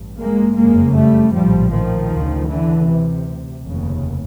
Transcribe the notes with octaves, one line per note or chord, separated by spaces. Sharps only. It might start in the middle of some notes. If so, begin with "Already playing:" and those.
Already playing: A1 G2
G#3 A#3
F#1 F2 C#3 G#3 A#3
G3 A3
A#1 A2 F3 G3
D#3 F3
D2 C#3
D3 E3
D2 C3
F1 D#2 C#3